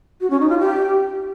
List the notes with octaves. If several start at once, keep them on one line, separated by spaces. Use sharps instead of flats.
F#4
C#4
D#4
F4
G4